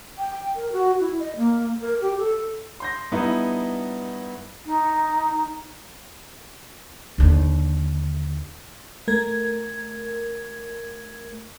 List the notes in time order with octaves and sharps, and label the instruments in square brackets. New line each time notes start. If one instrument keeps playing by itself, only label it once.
[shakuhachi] G5
A#4
F#4
E4
D#5
A#3
A#4
G4
A4
[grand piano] C6 G6 A#6
G2 B3 D#4 E4
[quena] D#4
[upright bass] D#2 D3
[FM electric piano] A3 A#4 G#6